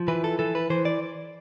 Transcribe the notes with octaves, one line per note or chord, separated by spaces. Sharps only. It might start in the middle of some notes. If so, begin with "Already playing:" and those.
Already playing: F3
E3 B4
A4
E3 A4
B4
E3 C5
D5